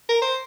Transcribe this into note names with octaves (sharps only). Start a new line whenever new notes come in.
A#4
C5